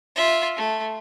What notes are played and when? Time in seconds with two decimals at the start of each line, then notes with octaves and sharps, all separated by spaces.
0.16 F4 E5
0.57 A3